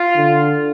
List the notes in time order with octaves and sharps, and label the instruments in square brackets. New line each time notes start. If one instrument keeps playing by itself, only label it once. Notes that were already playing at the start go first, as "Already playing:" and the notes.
Already playing: [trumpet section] F4
[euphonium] D3